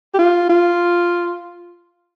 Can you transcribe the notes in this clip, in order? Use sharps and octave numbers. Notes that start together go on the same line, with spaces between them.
G4
F4
F4